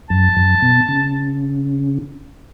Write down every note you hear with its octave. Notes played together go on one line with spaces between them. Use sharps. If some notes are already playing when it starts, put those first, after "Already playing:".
F#2 A5
F#2
B2
C#3